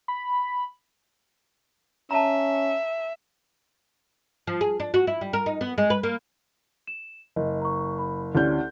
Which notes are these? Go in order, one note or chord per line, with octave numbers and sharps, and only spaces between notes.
B5
C#4 E5 A5 A#5
F3
G#4
D4
F#4
E4
G3
A#4
D#4
B3
G#3
B4
A#3
E7
F#1 D#5
A#5 C#6
B5
D2 C#4 E4 G4 D5 G6